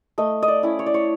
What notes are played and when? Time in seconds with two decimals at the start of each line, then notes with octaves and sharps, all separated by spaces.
0.18 A3 D#5
0.43 D#5
0.48 D5
0.63 C#4 E4
0.79 C#5
0.86 D5
0.94 C#5